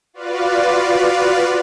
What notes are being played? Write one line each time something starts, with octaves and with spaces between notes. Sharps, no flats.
F4 F#4 B4 D5 F5